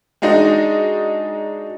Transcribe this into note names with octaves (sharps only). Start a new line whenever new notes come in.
G#3 D4 D#4 F#4 D#5